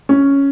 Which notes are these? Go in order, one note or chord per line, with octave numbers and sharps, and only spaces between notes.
C#4